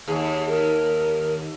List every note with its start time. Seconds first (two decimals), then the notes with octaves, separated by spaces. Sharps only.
0.08 D#2 G#4
0.48 A#4